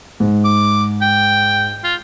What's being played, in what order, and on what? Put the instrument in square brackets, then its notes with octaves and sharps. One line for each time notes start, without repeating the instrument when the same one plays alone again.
[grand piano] G#2
[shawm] D6
G5
F4